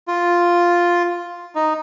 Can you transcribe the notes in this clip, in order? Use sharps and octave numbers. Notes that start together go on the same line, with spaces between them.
F4
D#4